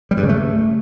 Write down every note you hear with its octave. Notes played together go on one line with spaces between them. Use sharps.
G3
G2
C#3
A3